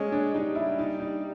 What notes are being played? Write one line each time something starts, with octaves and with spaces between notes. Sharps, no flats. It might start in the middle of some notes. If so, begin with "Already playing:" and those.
Already playing: G#3 C#4
D4
G3 D#4
E4
D#4
D#4